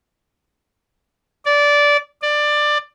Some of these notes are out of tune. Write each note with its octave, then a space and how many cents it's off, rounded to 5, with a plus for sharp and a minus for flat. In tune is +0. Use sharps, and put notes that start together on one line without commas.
D5 -15
D5 +15